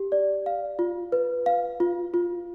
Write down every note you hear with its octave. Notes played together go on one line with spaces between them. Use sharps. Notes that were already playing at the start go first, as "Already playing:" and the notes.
Already playing: G4
D5
F5
F4
B4
F5
F4
F4